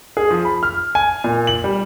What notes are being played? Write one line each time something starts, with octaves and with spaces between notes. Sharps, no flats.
G#4
F3
B5
F6
G#5
A#2
F#7
G3